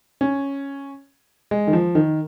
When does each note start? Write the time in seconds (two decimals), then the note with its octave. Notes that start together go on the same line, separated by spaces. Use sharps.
0.21 C#4
1.51 G#3
1.67 D#3
1.73 F3
1.95 D#3